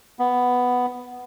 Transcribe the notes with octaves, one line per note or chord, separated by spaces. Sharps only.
B3